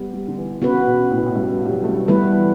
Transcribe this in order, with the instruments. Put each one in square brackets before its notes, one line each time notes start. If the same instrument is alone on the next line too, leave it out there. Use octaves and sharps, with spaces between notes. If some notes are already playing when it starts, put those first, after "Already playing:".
Already playing: [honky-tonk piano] G3 [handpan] B3
[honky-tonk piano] G3
D3
E3
[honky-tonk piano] C#3 [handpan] B3 F#4 B4
[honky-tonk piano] B2
A2
B2
A2
G2
G3
F#3
A3
G3
[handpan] E3 G3 B3 E4 B4 [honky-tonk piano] A3